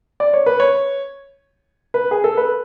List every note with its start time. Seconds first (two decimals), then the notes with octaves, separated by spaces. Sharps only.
0.20 D5
0.33 C#5
0.46 B4
0.60 C#5
1.94 B4
2.11 G#4
2.24 A4
2.37 B4